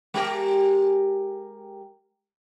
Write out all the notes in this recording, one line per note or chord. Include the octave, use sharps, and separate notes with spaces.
G#3 G4 A#4